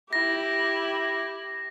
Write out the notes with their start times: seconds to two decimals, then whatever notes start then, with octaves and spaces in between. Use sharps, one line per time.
0.13 E4 G4 A#6